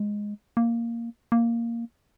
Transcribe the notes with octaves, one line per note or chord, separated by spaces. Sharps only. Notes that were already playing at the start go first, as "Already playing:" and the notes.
Already playing: G#3
A#3
A#3